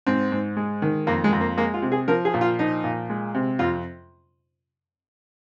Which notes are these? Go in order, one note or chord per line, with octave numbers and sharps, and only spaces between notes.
G#2 C4
G#2
G#3
D#3
F2 A#3
G#3
F2
A#3
G#3 A#3
F4
C3
G#4
F3 A#4
G#4
A#2
F4
F3 D#4
A#2
G#3
C3
F2 F4